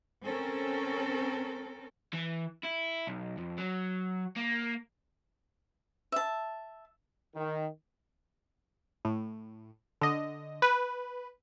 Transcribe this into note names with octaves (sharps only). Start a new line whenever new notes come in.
C4 C#4 A4 A#4
E3
E4
B1
F2
F#3
A#3
E5 A5
D#3
A2
D3 D#5
B4